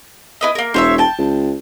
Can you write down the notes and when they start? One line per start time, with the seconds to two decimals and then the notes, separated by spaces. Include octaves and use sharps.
0.41 E4 B4 D#5
0.55 A#3 A#4
0.74 E1 C5 C#5 E5
0.98 G5 A5
1.19 C#2